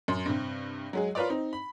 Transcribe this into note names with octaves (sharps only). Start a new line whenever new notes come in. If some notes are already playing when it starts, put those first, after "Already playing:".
F#2 C6
G2 C3
F#3 G#3 G#4
F4 A#4 B4 C#5 D5
C4 D#4
B5